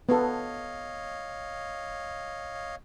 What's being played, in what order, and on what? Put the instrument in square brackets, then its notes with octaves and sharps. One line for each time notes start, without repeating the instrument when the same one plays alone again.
[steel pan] B3 A4 [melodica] C#5 D#5 F5